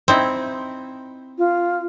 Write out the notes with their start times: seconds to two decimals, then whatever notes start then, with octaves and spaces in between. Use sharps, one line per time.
0.08 C4 D#4 E4
1.38 F4